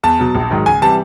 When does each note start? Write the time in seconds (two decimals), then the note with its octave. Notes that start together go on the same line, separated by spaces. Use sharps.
0.03 E2 A5
0.19 B2 F#3
0.35 A#1
0.50 G#2 D#3 F#3
0.66 C#2 G#5
0.81 C3 E3 G3 A5